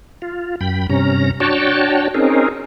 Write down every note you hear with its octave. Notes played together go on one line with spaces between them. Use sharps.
F4
F#2 G5 B5
G2 C3 C#4 A#5
D4 F#4 C#5 G5 A5
C4 C#4 D#4 G#4 A#4